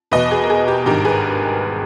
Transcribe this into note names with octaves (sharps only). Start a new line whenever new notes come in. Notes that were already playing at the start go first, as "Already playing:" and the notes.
E2 B2 B4 D#5
G#4
A#4
G#4
G4
G#1 G2 D#3 G4 A#4
G#4 B4